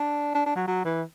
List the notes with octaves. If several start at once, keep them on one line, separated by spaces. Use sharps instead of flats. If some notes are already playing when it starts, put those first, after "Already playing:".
Already playing: D4
D4
D4
F#3
F#3
E3